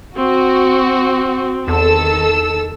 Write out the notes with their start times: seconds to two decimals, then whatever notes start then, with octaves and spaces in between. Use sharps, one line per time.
0.16 C4 F#4
1.68 E2 D#3 A4 E6